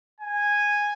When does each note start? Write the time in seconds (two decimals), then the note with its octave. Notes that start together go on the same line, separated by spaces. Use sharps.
0.21 G#5